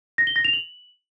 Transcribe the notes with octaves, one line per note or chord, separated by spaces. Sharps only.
A#6
G7
A#6
F7
F#7